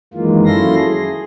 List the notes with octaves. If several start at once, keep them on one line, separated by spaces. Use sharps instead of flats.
F#2 D#3 E3 G#3 A#3 F4
F#3 C#4 E4 A4 C6 A#6
G#4